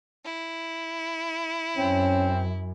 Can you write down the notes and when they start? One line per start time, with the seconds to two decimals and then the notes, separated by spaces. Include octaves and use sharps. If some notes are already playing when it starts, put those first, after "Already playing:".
0.25 E4
1.78 F#2 C4 C#4